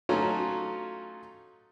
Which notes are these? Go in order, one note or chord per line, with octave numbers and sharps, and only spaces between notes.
F#3 A3 C#4 D#4 F4 F#4